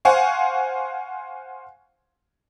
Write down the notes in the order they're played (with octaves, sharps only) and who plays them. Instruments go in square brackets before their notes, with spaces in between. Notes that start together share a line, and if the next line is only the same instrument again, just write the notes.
[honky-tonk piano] C5 F5 F#5 G#5 C#6